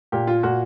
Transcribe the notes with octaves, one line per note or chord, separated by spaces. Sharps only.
A#2 G4
F4
A#2 F#4